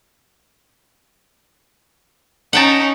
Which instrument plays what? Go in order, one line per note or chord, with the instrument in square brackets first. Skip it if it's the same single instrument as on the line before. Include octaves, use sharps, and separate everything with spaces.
[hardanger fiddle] C#4 D#4 [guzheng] F#5 G5 A5